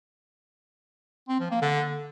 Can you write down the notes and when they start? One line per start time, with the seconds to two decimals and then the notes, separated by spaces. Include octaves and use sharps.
1.29 C4
1.40 F3
1.51 A#3
1.62 D3